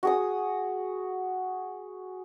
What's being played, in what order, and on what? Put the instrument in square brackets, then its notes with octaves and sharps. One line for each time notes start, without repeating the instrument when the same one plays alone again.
[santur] F#4 G#4 D#6